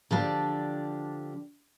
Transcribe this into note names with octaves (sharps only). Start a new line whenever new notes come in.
D3 F3 D4 G4